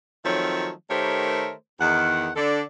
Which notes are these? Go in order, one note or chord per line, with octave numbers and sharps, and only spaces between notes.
D#3 F3 F#3 A3 C4 C#5
D#3 A3 G4 A#4 C5 C#5
E2 D#3 F#5
D3 D4 A4